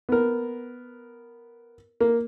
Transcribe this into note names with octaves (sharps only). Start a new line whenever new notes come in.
B3 A#4
A#3